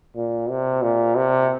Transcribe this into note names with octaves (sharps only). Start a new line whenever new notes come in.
A#2
C3
A#2
C3